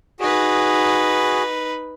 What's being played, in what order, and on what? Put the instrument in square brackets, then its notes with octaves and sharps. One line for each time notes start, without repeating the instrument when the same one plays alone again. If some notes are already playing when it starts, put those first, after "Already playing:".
[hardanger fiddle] D#4 B4 [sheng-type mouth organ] F#4 G#4